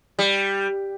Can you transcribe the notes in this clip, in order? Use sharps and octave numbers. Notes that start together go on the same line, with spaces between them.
G3